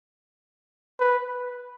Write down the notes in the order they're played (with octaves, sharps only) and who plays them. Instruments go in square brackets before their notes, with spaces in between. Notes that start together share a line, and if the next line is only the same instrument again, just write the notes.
[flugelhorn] B4